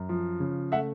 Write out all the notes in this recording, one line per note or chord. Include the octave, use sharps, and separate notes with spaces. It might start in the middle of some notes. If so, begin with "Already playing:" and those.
Already playing: F#2
F3
C#3
A3 E5 F#5